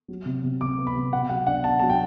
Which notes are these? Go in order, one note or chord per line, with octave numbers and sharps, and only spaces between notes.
F#3
C3
C3
C3 D6
B3
B5
C3
B2 F#5
F#3 F#5
D4 F#5
D4 A5
F#3 A5
G5